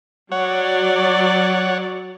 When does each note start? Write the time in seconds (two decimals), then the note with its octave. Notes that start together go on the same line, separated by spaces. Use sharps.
0.32 F#3 C#5 D5 F#5